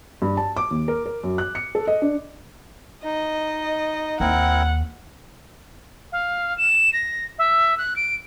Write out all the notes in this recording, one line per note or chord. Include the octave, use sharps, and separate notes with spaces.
G2
A5
D6
D#2
A#4
A#4
F#2
F#6
C#7
A4
D#5
D4
D#4 D#5
D#2 C4 E4 A#4 F#5
F5
E7
A#6
E5
F#6
D7